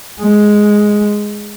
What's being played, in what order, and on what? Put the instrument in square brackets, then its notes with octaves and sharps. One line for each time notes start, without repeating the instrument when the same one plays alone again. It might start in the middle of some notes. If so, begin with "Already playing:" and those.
[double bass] G#3